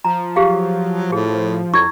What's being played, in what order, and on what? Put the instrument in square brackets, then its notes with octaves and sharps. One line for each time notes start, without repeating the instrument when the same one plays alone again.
[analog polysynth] F3 [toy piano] A#5
[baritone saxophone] F#3 [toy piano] G4 G#4 F5
[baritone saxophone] A2 [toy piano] G#4
[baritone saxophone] F2 [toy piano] E4 E6 [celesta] C#6 G#6